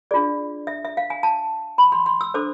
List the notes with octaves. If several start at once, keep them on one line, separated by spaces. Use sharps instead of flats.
D4 F4 G#4 D5
E5
E5
F5
G#5
A5
B5
C6
C6
E6
D4 A4 C5 D6